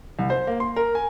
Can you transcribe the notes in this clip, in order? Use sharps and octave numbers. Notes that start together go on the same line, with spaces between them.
C2
C5
A#3
C6
A#4
G#5